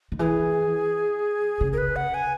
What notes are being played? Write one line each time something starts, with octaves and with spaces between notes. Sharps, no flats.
D#3
E3 G#4
C#3
A#4
B4
F#5
G#5